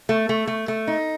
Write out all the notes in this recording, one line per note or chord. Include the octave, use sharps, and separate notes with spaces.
A3
A3
A3
A3
D#4